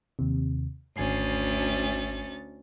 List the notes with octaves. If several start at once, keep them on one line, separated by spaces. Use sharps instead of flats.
D#2 C3
G#1 D2 C#4 G#5 A6 C7